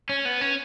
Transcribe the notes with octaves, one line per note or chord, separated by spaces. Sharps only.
C#4
B3
C#4